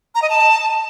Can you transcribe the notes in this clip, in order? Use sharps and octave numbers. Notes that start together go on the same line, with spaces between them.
A#5
D#5
A5